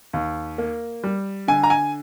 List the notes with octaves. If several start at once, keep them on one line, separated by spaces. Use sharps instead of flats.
D#2
A#3
G3
D3 G#5
A#5
G#5